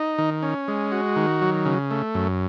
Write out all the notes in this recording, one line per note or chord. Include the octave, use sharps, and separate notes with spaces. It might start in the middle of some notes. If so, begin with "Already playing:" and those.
Already playing: D#4
D#3
C#4
G#3
F#4
D#3
F#3
C#3
A3
F#2